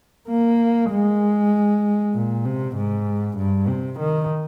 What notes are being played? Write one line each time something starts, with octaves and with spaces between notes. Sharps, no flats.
A#3
G#3
A#2
C3
G#2
G2
C3
D#3